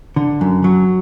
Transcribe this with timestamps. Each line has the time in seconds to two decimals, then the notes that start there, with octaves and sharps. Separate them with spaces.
0.16 D3
0.41 F#2
0.64 F#3